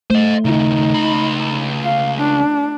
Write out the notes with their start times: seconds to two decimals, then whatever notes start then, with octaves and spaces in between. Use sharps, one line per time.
0.10 A3 C5 D#5
0.45 D#2 C#3 D#4
0.94 C#2 B5
1.83 F5
2.18 D4